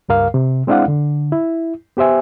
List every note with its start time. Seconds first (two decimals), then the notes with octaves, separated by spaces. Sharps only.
0.09 C#2 G2 A#4 F5
0.34 C3
0.67 G#3 C4 D4 E4 F5 F#5
0.88 D3
1.32 E4
1.97 B3 G4 C5 E5 G#5